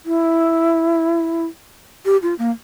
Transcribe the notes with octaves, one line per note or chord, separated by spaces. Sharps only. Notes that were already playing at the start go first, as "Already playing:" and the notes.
E4
G4
F4
A#3